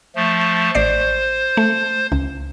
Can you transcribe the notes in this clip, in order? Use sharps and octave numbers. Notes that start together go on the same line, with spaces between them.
F3 A3
A1 C5 D5 C7
A3
C#2